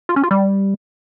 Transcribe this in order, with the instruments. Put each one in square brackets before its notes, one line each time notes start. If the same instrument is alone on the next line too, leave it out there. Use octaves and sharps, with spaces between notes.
[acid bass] F4
C#4
F4
G3